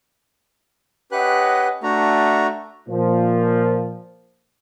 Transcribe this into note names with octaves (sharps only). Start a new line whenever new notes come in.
C#4 G4 B4 D#5 F#5 F#6
A3 D4 F#4 A#5
A#2 F3